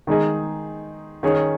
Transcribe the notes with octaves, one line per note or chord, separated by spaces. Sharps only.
D#3 G#3 D#4 G#4 D#5
D#3 C#4 G#4 C#5